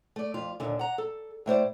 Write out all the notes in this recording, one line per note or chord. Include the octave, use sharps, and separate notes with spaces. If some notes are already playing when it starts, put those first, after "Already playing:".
A3 D5
F2 F4
D#2 A#2 D3
F#5 A#5
A4
A2 A3 C5 D5